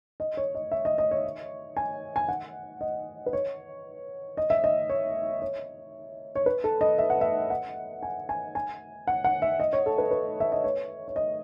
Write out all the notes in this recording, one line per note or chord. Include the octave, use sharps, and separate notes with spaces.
D#5
C#5
D#5
E5
D#5
D#5
C#5
G#5
G#5
F#5
D#5
B4
C#5
D#5
E5
D#5
C#5
C#5
C#5
B4
A4
D#5
E5
F#5
E5
F#5
G#5
G#5
G#5
F#5
F#5
E5
D#5
C#5
A4
B4
B4
E5
D#5
C#5
C#5
D#5